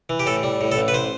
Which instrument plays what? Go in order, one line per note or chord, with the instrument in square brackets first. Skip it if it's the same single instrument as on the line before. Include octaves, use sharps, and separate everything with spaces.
[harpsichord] E3
G4
A2 A4
G3
A2
A4
A1
B4
C5